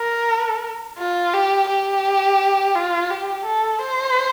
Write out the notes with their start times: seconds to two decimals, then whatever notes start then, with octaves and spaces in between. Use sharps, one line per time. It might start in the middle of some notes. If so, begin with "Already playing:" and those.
Already playing: A#4
0.98 F4
1.33 G4
1.69 G4
2.75 F4
3.10 G4
3.45 A4
3.82 C5